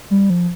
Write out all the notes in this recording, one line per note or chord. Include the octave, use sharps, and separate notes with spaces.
G3
F3